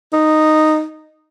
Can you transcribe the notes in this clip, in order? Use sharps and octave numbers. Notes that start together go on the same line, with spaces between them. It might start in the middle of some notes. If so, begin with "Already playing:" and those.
D#4